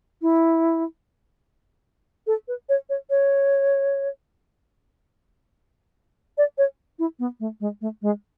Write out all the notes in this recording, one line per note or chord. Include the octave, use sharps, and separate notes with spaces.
E4
A4
B4
C#5
C#5
C#5
D5
C#5
E4
B3
A3
G#3
A3
G#3